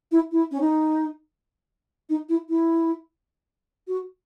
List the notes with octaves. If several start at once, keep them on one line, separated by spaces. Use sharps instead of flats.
E4
E4
C#4
D#4
D#4
E4
E4
F#4